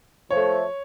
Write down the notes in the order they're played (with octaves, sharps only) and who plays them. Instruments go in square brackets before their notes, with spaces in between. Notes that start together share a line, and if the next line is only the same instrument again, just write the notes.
[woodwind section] F3 A3 [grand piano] C#5